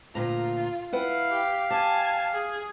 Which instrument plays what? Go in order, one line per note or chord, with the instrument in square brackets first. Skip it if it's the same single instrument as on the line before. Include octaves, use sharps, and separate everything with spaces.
[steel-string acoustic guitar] D2 A#2 A#5 [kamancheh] F4
[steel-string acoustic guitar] E4 B4 F#5 [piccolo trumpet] F5
[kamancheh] G4
[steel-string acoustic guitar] G4 [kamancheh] G#5 A5
[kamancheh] G#4